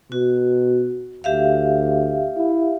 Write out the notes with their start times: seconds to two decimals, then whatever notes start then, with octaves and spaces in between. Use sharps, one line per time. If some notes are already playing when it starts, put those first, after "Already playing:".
0.12 B2 F#4
1.24 D2 G4 E5 F5
2.37 E4